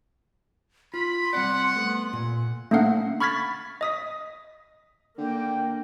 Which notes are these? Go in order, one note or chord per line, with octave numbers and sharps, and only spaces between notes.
F4 B5 C6
G3 C4 D5 F#5
A3 B3
A#2
A3 A#3 C#4 D4 F5 F#5
B5 C#6 F6 G#6 A6 B6
D#5 D#6 B6
D3 A#3 G5